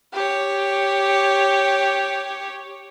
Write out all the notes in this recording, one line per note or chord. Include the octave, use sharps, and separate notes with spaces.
G4 C#5